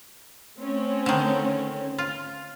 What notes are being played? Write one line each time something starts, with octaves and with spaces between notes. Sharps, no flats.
A3 C4 C#4
D3 D#3
F4